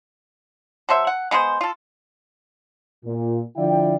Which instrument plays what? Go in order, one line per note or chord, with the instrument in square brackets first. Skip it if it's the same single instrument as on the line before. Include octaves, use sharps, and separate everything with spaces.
[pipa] F#3 A4 C5 E5
F#5
G#3 B3 G#4 C5
F4 A4
[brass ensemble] A#2
D3 F3 E4 D5 F5 G5